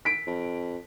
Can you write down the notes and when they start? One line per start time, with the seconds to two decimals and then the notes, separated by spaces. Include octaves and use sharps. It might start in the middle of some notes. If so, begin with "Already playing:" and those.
0.05 B6 D7
0.27 F2